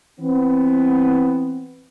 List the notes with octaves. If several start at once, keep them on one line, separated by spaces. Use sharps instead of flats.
E3 B3 C4